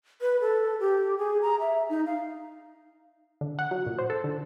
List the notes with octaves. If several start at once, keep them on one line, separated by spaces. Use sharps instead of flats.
B4
A4
G4
G#4
A#5
E5
D#4
F5
D3
F#5
F#3
A#2
C5
A4
D3